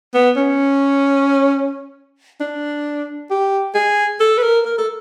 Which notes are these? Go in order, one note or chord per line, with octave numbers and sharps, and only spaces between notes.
B3
C#4
D4
G4
G#4
A4
B4
A#4
A#4
A4